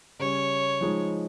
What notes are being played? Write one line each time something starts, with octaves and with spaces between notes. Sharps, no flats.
C#3 G3 C#4 C#5
F3 G#3 D#4